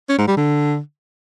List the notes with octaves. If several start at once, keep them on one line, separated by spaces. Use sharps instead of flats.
C#4
G#2
G3
D3